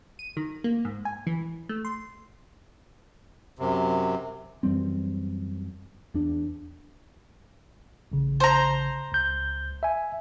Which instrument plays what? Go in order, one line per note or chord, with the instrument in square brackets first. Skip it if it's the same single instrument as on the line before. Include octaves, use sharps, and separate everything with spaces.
[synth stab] D#7
D#3
A#3
G#2
G#5
E3
A3
C6
[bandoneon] F#2 C3
[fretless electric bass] F#2 E3 G3 C4
E2 D4
[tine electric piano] A1 C#3
[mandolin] C5 A#5
[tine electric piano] C#2 G6
E5 G#5